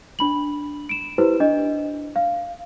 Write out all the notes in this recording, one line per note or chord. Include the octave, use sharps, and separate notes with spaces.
D4 B5 F#7
D7 E7
E4 G4 B4 C5
D4 D#5
F5